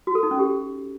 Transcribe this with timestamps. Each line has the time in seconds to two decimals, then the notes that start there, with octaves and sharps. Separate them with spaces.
0.07 F#4
0.15 A4
0.23 D#4
0.31 C#4
0.39 G4